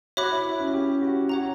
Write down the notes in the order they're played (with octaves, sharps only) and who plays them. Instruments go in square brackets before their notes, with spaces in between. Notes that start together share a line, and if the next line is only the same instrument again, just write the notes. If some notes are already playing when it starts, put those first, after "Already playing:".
[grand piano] F#4 [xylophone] C#5 E5 B5 D6 F#6
[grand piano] E4
E4
C#4
G4
F#4
[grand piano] F#4 [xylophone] C#5 F#5 A#5